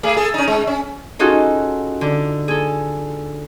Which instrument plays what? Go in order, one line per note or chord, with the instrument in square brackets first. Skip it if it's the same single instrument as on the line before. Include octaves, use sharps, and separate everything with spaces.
[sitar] A3 G#4
G#4 A4
C#4 D#4
G#3
C#4
[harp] C#4 D#4 F4 F#4 G#4 A4
D3
G#4 A4